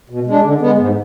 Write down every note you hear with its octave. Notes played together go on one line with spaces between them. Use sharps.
B2
G#3 D4
D3
G#3 B3
G#2